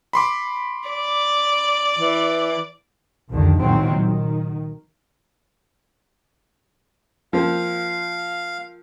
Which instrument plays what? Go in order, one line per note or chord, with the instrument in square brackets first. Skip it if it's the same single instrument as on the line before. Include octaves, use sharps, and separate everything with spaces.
[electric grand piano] B5 C6 D6
[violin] D5
[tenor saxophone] E3
[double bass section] C2 F2 D3 D#3 F3
C#2 A#2 D#3 E3 F#3 C4
D#3
[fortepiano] F3 A#3 C4 [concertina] F5